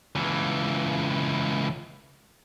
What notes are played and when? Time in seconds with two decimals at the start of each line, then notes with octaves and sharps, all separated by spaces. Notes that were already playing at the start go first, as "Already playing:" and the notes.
0.15 C#2 E3